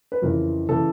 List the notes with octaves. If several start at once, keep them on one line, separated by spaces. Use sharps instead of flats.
B4
F2 C#3 E3 A#4
C#3 E3 A4